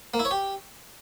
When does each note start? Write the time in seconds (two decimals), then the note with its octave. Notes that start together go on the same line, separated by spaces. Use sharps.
0.14 A#3
0.19 E4
0.25 C#5
0.31 G4